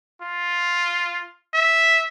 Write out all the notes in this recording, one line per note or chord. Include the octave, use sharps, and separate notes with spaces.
F4
E5